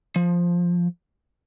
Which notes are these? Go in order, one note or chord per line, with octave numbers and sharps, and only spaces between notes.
F3